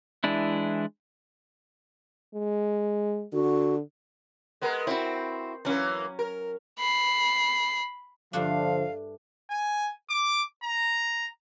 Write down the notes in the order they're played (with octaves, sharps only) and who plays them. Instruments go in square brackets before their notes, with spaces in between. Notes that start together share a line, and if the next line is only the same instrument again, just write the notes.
[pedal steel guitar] E3 G#3 D4 E4
[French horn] G#3
[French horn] D3 [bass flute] F#4
[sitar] G#3 B3 A#4
[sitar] C4 [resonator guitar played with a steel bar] E4 F#4
[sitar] E3 A#3 [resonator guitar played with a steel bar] F#3 C#4
[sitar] A#4
[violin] B5 C7
[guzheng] G2 A3 D4 [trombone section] D3 F3 [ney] F5
[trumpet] G#5
D6
A#5